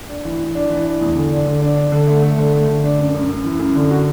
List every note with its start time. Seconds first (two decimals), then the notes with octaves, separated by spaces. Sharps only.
0.09 D4
0.25 E3
0.40 E3
0.55 D4
0.70 E3
0.85 D4
1.01 E2
1.15 D3
1.31 D4
1.47 D3
1.61 D4
1.77 D4
1.92 D3
2.07 A3
2.22 A3
2.38 D3
2.54 A3
2.68 D3
2.84 D4
2.99 F#2
3.14 F#2
3.29 F#2
3.44 E3
3.59 F#2
3.75 D3
3.91 F#4